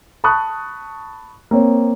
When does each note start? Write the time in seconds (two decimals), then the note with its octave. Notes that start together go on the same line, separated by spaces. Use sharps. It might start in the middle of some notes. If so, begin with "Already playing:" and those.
0.24 A5 B5 C#6 D#6 F#6
1.51 A#3 C4 C#5